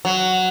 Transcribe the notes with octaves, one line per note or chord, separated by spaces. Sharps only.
F#3